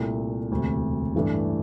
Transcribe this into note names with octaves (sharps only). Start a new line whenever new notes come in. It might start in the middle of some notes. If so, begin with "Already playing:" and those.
Already playing: C2 A#2 A3
E1 D2 C3
A1 G2 E3 A3 D4